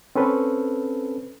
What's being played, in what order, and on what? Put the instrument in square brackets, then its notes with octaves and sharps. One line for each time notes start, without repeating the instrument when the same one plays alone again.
[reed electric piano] C4 C#4 A4 B4